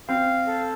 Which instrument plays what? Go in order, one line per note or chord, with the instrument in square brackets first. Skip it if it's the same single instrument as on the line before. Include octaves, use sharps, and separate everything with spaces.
[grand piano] C4 [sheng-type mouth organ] F5
[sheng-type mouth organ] A4